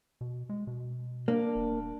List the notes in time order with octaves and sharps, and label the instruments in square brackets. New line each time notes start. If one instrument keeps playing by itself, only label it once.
[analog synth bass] B2
G#3
B2
[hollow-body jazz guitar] A#3 [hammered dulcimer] D4 D6
[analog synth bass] D#1